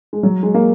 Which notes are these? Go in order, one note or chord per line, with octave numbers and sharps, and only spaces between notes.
G#3
F#3
G#3
A#3